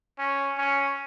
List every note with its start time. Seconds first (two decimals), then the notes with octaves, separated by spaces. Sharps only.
0.18 C#4
0.58 C#4